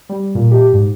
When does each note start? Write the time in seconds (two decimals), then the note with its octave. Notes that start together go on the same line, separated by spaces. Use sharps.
0.09 G3
0.35 A#2
0.51 G4
0.73 G#2